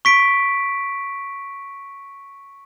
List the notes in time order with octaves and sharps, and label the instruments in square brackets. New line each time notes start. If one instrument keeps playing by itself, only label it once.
[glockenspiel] C#6 B6 D7